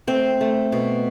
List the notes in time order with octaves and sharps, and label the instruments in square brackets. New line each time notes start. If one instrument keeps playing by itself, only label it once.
[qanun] A3 C4
A3
B2